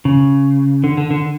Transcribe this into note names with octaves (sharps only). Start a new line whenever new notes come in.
C#3
D3
D3
D3